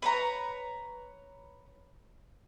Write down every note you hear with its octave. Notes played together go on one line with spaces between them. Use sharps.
B4 C#5 A#5